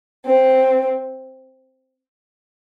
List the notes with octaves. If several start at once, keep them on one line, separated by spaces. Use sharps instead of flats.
C4